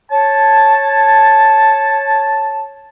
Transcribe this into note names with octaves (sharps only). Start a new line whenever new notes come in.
C#5 A5